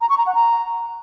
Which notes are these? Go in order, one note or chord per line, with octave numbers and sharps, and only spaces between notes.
A#5
C#6
A#5
F#5
A#5